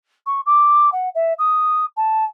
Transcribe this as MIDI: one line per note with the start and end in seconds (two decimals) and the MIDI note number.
0.26 0.41 85
0.46 0.90 86
0.92 1.09 78
1.15 1.33 76
1.39 1.85 87
1.97 2.25 81